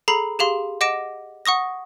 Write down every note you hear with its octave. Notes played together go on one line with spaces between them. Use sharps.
G#4 A4 A#5 B5 C7
G4 G#4 F5 C6
D#5 F#5 D6 A#6 D7 E7
F#5 C#6 D#6 A#6